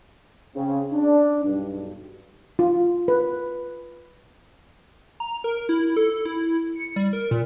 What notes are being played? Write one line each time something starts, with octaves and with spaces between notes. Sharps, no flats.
C#3 C4
D4
B1 G2
F4
B4
A#5
A#4
E4
A4
E4
C#7
G3
A#4
A#2